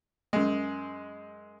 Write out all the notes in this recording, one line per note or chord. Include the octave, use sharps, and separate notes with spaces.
F#2 G#3